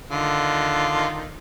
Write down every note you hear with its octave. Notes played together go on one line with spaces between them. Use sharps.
D3 D#3 F4